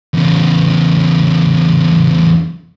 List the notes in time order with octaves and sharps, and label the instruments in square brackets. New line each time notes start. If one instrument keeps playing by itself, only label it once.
[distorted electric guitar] E2 C#3